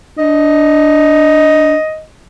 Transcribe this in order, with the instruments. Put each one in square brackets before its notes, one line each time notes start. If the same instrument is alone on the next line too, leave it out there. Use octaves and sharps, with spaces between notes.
[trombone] D4 [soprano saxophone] D#5